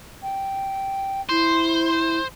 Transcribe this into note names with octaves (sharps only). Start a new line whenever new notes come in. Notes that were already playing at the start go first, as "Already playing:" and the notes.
G5
E4 C5